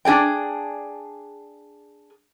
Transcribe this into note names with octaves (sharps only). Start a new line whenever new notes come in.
D4 G#4 D5 G5